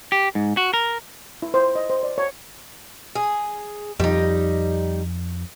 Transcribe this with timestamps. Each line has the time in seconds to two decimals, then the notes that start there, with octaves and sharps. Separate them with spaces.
0.12 G4
0.35 G#2
0.57 F#4
0.74 A#4
1.42 E4
1.54 C5
1.75 D#5
1.90 C5
2.03 D5
2.18 C#5
3.15 G#4
4.00 F2 G3 D#4